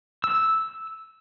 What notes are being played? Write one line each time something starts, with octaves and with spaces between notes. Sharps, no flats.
E6